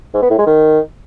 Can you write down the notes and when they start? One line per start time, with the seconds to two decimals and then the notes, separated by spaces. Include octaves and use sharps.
0.14 G#2
0.22 B3
0.30 A2
0.38 G#3
0.47 D#3